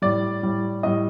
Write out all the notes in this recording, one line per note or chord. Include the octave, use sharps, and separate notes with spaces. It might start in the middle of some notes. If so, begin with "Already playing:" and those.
A2 G3 D5
A2 G3
A2 G3 D#5